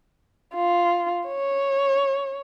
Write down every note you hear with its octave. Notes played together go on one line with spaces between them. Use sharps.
F4
C#5